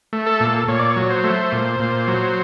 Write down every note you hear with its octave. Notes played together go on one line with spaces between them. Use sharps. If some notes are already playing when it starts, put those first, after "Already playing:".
A3
A4
A#2
A#2 C#5
D5
C#5
F#3
C5
A3
A#2
A#2
F#3